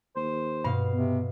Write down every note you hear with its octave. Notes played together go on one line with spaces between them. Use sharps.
D#2 C5
G2 B2 F5
C3 B3